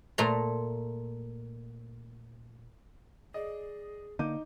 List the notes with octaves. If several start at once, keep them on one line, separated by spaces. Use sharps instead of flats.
A#2 A3 A#5 C6
G#4 D5 D#5
D3 A#3 D#4 D6 G6 D#7